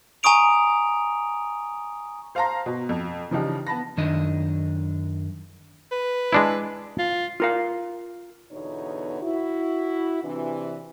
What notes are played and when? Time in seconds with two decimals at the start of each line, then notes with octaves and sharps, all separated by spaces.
0.23 G#5 A#5 C#6 D#6 D7 F7
2.35 C5 F5 A5 A#5 C6 A#6
2.66 B2
2.89 F2
3.31 C#3 E3 F3 D4 D#4 G4
3.67 B3 A5 B5 A#6
3.97 F#2 D#3 D4 D#5
5.92 B4
6.33 G#3 D4 E4
6.99 F4
7.40 F4 A#4 F5
8.52 E2 B2 D3 B3 D#4 C#5
9.23 E4 F#4
10.23 C3 E3 D4